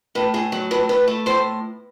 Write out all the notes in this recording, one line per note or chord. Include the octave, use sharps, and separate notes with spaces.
A2 B4
A2 G#4
F#3
A2 B4
A3 B4
A3
A2 C5